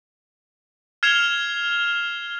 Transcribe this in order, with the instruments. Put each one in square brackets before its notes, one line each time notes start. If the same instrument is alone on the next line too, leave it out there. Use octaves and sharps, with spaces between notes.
[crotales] F6 G#6 C7 E7 F7 G7